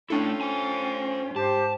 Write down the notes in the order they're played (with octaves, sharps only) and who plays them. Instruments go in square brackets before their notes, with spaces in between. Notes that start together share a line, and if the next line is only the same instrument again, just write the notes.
[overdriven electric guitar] A3 E4 [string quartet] C#4 F4 G5 [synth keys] D4 A4
[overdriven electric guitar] C5 G#5
[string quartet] G#2 [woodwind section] G4 C5 [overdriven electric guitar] A5